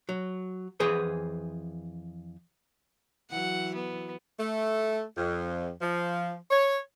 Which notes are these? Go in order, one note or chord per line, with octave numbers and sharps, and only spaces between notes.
F#3
F2 E3 G#4 B4 C5
E3 F#3 F#5
B3
A3
F2
F3
C#5